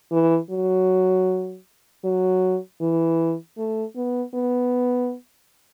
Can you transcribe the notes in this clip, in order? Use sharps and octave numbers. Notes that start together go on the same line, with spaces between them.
E3
F#3
F#3
E3
A3
B3
B3